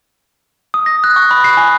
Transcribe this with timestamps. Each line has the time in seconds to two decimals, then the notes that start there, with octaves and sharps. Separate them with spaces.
0.74 D#6
0.86 A#6
1.04 F#6
1.16 C#6
1.31 B5
1.44 C7
1.57 G#5